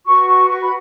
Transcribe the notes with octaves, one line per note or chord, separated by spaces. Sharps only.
F#4 B4 C#6
C#6
C#6
B5